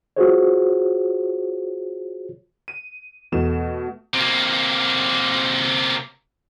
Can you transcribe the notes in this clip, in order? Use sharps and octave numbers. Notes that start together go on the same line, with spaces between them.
F4 F#4 G#4 C5 C#5
D#7
E2 B2 E3 A3 E7
C3 A#3